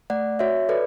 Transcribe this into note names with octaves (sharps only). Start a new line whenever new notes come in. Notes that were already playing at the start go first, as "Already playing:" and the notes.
A3 D5 F#5
F#4 C#5 E5
A4 B4 D5